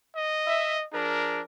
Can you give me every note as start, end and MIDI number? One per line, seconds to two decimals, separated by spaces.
0.16 0.85 75
0.46 0.75 76
0.93 1.41 53
0.93 1.42 62
0.93 1.41 68
0.93 1.41 70